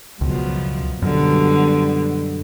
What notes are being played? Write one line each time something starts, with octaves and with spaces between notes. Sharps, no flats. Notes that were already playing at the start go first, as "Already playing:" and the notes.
C#2 F#2 B2 F3
F#2 B2 D3 G3